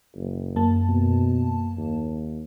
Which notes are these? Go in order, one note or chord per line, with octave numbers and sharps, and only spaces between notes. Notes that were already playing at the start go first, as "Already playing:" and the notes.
F#1
F#2 A#3 A5
B2
D#2